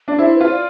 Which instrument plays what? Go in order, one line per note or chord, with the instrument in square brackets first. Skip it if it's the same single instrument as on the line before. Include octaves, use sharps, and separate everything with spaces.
[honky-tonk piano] D4
[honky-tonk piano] E4 [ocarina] C5
[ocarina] B4
[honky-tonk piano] F4 [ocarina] C5
[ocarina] D5